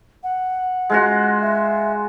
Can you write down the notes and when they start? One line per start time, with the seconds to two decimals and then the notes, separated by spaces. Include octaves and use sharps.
0.23 F#5
0.90 G#3 F4 F#4
1.41 E5